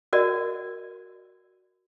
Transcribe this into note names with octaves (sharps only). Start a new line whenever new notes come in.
F#4 A#4 D5 D#5